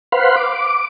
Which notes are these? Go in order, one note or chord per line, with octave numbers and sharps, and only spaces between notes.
B4 C5 F5 F#5 B5 C6
D6